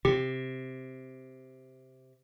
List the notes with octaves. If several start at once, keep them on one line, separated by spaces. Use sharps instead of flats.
C3 G4